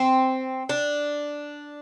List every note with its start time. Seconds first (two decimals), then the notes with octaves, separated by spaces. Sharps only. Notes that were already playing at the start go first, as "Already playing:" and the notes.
Already playing: C4
0.69 D4